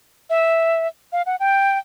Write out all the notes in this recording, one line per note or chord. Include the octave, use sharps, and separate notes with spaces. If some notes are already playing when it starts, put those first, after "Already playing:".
E5
F5
F#5
G5